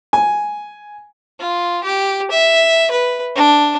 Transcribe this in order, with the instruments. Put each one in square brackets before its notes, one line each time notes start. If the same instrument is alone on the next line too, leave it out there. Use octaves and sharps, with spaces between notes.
[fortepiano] G#5
[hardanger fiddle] F4
G4
E5
B4
D4